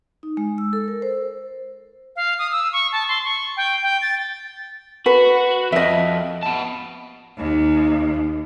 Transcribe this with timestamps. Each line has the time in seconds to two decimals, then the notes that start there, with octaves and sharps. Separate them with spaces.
0.23 D#4
0.37 G#3
0.58 E6
0.73 A4
0.88 A#4
1.02 C5
2.16 F5
2.39 D#6
2.52 E6
2.73 C#6
2.92 A5
3.08 C6
3.25 C#6
3.57 G5
3.83 G5
4.02 A6
5.06 F#4 B4
5.72 F2 D#5 E5
6.43 B3 A5
7.38 D#2